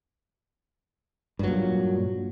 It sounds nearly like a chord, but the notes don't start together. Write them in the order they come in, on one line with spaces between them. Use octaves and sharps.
G2 F#3 A#2